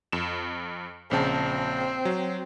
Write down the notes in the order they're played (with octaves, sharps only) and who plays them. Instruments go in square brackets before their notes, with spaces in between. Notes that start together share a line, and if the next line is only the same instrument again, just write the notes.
[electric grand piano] F2 E7
[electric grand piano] A#1 C#3 A5 [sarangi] C4
[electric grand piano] F#3